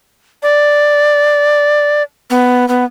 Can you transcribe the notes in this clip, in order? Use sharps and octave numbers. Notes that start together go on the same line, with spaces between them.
D5
B3
B3